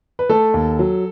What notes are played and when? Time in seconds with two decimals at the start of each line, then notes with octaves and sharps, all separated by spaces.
0.19 B4
0.29 A3 A4
0.54 D#2
0.79 F#3